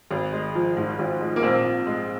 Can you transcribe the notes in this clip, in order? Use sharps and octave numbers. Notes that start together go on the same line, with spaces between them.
G#1
G#3
F3
G#2
G#1
G#3
A#3
A#1 C4
A#1
G#3